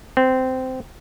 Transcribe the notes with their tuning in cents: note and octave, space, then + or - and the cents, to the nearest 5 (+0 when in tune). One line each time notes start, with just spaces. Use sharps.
C4 -15